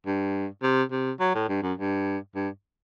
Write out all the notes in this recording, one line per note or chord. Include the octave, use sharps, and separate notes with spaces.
G2
C3
C3
F#3
A2
G2
F#2
G2
G2